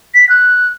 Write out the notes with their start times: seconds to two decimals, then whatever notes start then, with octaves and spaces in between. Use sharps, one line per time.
0.15 B6
0.29 F#6